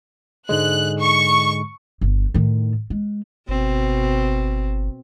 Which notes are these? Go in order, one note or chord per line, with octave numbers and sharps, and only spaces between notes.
G#2 D3 G#3 F#6
C#6
G1
A2 D#3
G#3
G1 B2 C4